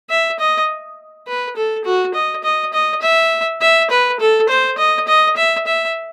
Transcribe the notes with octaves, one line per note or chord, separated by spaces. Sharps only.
E5
D#5
B4
A4
F#4
D#5
D#5
D#5
E5
E5
B4
A4
C5
D#5
D#5
E5
E5